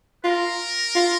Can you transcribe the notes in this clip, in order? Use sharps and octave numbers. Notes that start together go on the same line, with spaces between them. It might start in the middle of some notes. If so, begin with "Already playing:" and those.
F4 A#4
F4